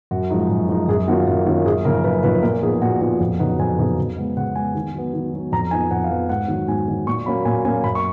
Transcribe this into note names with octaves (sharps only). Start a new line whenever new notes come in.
F#2 F#4
F3 G#3 D#4
F#2
F3 G#3 D#4
F#2 G#4
D#3 A#3 C#4 F4 F#4
F#2
D#3 A#3 C#4 F4
F#2 G#4
C#3 F3 A#3 D#4 A#4
F#2 B4
C#3 F3 A#3 D#4 B4
A#2 A#4
F3 B3 D#4 G#4
A#2 F#4
F3 B3 D#4 F#4
F2
C#3 F#3 B3 D#4 F#5
F2 G#5
C#3 F#3 B3 D#4
C#3
G#3 B3
C#3 F#5
G#3 B3 G#5
D#3
F#3 B3
D#3
F#3 B3
F2 A#5
F3 B3 D#4 G#5
F2 F#5
F5
F3 B3 D#4
G#2 F#5
D#3 F#3
G#2 G#5
D#3 F#3
A#2 C#6
F#3 A#3 C#4 B5
A#2 G#5
F#3 A#3 C#4 G#5
F#2 B5
C#6